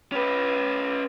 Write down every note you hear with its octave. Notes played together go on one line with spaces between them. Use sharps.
C#4 B4